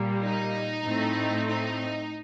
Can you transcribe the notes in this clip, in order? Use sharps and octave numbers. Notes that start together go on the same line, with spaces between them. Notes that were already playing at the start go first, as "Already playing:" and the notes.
Already playing: A#2 G3 A#3
D#4
A2 A3 C4
D#4